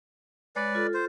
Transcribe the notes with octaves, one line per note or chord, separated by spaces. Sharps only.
G#3 B4 C#5 D5
F4 A4
C5